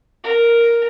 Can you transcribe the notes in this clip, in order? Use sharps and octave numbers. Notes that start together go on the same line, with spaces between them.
A#4